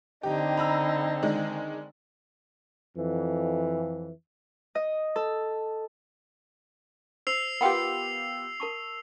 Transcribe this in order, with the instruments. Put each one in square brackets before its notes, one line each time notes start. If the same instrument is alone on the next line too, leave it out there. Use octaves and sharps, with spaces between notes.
[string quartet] D3 C4 D#4 [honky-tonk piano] G4
[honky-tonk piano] A#5 B5 E6
D#3 G#3 D4
[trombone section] F2 E3
[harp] D#5
A4
[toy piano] C5 [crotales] E6 C7 F7
[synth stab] B3 F4 G4 [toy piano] A#4 G5 C6
[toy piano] A#4 A5 C#6